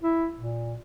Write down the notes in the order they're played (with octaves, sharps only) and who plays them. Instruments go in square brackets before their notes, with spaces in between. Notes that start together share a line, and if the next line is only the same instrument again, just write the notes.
[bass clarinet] E4
A#2